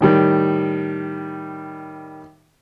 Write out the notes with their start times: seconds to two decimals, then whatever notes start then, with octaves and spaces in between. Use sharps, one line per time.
0.01 A2 D#3 G3